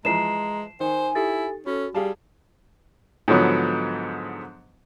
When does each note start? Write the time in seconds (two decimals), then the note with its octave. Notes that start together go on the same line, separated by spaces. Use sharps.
0.05 E3 F3 G#3 A#5 C7 E7
0.80 D#3 C5 G#5
1.15 E4 G4 A4 A6
1.66 C#4 F#4 A4
1.95 G3 G4 G#4 F5 A5
3.28 G#2 D3 F3 F#3 B3